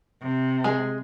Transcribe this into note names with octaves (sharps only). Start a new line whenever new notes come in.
C3
G#3 G#4